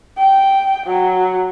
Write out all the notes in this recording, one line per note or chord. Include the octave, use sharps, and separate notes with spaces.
G5
F#3